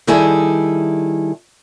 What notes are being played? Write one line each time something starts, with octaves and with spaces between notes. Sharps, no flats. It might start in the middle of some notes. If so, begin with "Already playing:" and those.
D#3 G3 E4 G#4 A4